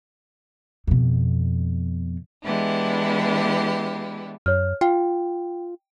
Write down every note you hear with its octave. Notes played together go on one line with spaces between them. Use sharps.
F2 B2
E3 G#3 B3 D4 E4 G4
F#2 C#5 F6
F4 G5